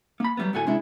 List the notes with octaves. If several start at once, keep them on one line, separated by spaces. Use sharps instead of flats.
A#3 B5
F#3 G3 A3 B3
D2 A2 F#4 A4 G#5
C3 G#3 C#4 D4 E4